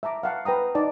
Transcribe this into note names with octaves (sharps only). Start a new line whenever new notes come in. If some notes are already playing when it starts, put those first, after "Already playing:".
E5 A5 A#5 D6
F5 F#5 A5
B4 G5 A#5 D#6
D#4 D5 A5